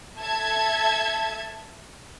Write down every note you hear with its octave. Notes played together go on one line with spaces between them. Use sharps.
A4 E5 A5 G#6